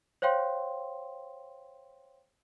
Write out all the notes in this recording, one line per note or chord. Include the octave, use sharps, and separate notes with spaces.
C5 C#5 F5 G5 C6